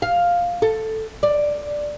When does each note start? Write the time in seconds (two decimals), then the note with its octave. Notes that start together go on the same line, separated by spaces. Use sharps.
0.02 F5
0.62 A4
1.23 D5